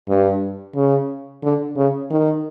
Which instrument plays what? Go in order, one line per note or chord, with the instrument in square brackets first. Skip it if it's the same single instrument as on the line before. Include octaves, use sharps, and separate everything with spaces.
[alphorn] G2
C#3
D3
C#3
D#3